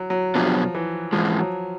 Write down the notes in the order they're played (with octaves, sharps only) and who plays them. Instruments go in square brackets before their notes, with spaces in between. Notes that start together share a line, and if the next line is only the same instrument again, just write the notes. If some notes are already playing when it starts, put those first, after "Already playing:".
Already playing: [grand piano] F#3
F#3
[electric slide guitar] B2 F#3 B3 D4 G4 [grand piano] F3
[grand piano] E3
[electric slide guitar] G#2 E3 G#3 [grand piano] F3
[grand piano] F#3